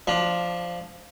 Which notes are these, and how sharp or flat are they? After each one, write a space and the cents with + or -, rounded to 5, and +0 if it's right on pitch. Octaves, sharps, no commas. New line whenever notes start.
F3 +0 D4 +0 B5 -40